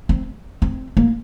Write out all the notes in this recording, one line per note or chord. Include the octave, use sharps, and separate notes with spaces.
C4
C4
A#3